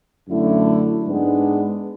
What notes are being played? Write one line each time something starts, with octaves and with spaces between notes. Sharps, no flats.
F#2 D3 A3 E4
G#2 G#3 B3 D4